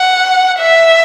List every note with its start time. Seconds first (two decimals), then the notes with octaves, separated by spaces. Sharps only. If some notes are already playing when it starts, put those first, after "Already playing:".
Already playing: F#5
0.59 E5